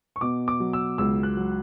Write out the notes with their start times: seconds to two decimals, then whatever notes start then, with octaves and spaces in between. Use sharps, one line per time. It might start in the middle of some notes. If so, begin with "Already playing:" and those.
0.16 C#6
0.21 B2 D6
0.48 D6
0.60 F#3
0.73 E6
0.98 C#2 E6
1.23 F#6
1.37 F#3